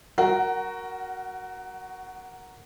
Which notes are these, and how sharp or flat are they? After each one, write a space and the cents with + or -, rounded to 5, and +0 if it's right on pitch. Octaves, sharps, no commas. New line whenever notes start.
F#4 +0 A#4 +0 F#5 +25